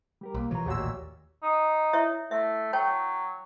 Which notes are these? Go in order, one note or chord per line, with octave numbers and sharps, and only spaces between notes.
G3 G4 A#4
B1 A#3
B2 E3 F3 C#5 A#5
A1 D#2 A#2 D#3 F#4 G4 E6
D#4
E4 C#5 E5
A3 E5
F#3 C#5 G5 A5